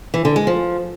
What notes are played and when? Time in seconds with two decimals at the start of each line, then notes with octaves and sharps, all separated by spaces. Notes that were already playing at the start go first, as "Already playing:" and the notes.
0.14 E3
0.25 D3
0.36 G#3
0.47 F3